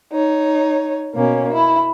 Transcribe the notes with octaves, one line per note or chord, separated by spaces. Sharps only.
D#4 C#5
B2 A#3 C#4
E4